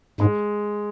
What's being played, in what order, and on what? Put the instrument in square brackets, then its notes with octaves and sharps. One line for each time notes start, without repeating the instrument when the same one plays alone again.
[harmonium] G#2 [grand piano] G#3